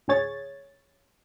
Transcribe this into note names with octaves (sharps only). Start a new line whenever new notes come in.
D2 A2 G#4 C#5 A6